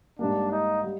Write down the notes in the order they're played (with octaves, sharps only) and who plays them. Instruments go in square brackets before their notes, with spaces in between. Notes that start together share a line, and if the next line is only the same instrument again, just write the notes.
[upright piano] G#2 G3 A#3 [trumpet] D4
[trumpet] D#4
[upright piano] G3